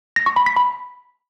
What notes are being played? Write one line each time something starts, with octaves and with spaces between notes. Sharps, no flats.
A#6
C#6
B5
B6
B5